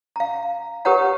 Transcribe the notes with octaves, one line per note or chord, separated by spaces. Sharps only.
F5 A#5
G4 A#4 B4 C#5 F#5 A#5